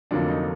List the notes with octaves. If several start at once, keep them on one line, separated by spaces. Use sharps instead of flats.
F1 F2 D3 F#3 A#3 D4
D#4